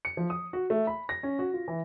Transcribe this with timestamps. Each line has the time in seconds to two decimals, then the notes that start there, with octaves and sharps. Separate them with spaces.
0.05 C#7
0.17 F3
0.30 D#6
0.53 F#4
0.70 A3
0.87 B5
1.09 A#6
1.23 C#4
1.39 F#4
1.53 F4
1.68 E3